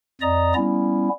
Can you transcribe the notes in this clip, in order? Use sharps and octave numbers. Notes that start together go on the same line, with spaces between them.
F2 D5 D#5 A#5 D#6
G3 B3 C#4 E4